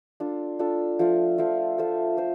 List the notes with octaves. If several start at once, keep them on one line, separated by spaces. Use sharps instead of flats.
D4 F4 A4
D4 F4 A4
F3 A3 F4
F3 A3 F4
A3 F4 C5
A3 F4 C5